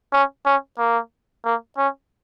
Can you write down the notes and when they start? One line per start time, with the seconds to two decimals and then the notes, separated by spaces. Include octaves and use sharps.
0.13 C#4
0.46 C#4
0.78 A#3
1.45 A#3
1.78 C#4